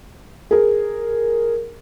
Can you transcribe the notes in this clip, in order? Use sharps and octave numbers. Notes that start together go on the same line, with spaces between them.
G#4 A#4